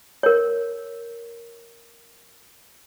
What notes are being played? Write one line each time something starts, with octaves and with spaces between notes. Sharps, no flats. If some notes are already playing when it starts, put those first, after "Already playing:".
A#4 C#5